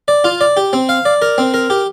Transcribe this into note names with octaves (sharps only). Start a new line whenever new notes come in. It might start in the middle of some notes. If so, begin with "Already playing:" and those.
D5
F4
D5
G4
C4
F5
D5
A#4
C4
A#4
G4